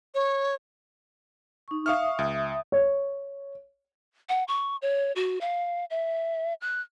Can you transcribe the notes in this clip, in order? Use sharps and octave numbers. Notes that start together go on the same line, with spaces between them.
C#5
D#4 C#6
E5 F5 C#6 D#6 F6
C#2
C#5
F#5
C#6
C#5
F#4
F5
E5
F#6